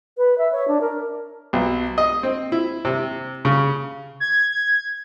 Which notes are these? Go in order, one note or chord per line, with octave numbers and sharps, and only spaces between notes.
B4
E5
C#5
D4
A#4
B1
D#5
C4
E4
C3
C#3
G#6